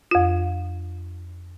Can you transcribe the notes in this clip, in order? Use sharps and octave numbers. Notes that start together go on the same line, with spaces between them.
F2 F4